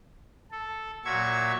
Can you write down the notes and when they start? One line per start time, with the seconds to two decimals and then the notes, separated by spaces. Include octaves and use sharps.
0.51 A4
1.05 A#2 F#3 E5 C#6 G#6